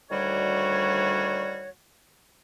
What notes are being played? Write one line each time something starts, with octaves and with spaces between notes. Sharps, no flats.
D2 D#3 G3 F#4 C#5